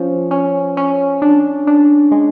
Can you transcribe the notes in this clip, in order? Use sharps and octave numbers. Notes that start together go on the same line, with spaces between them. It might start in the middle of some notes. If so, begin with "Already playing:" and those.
Already playing: F3 C#4
C#4
C#4
D4
D4
G#3